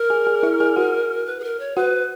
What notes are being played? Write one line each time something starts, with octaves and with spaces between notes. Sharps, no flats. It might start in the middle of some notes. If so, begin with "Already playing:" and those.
Already playing: A#4
G#4 G#5
G#4 G#5
E4 E5
G#4 G#5
F#4 F#5
B4
G#4
A#4
C#5
F#4 B4 F#5